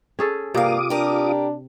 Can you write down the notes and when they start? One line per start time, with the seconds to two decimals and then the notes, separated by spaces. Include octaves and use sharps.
0.19 C#4 G#4 A4
0.54 G2 C3 A#3 F4 F5 D6 D#6
0.90 D4 G4 A#4